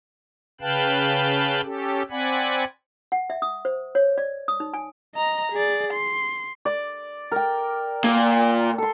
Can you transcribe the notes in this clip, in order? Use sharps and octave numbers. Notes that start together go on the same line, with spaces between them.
C#3 B4 F5 G5 A5 F#6
C#4 G4 A4
C4 D5 F#5 G#5 B5
F#5
E5
D#6
C5
C#5
D5
D#6
D#4
G#5
D#5 A#5
G#4 D5
C6
D5
A#4 G5
A#2
A4 C6